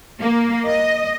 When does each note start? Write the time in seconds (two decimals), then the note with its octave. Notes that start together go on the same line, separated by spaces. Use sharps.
0.20 A#3
0.67 D#5